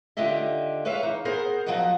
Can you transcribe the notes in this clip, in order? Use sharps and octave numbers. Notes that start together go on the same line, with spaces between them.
D#2 D3 F4 G4 D#5 E5
G#3 B4 C#5 E5 F5
E3 D#4
B3 G#4 A#4 C5 F#5
F3 F#3 B3 D#5 F#5